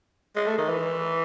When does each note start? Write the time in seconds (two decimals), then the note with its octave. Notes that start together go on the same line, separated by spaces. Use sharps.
0.36 G#3
0.47 A3
0.58 D#3
0.69 E3